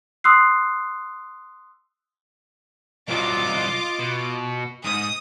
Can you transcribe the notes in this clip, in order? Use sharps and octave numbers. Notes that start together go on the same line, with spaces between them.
C6 D#6 E6 F#6 C7
C2 F#3 F4 D#5 D6
B2
G#2 D#6